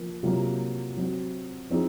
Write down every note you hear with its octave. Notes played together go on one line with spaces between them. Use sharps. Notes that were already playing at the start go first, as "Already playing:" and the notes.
Already playing: F3 A#3
C3 F#3 A#3 F4
F#3 C4 F#4
F3 C4 D#4 G#4